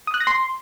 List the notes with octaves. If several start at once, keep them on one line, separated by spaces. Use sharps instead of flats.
D#6
F#6
A#6
C6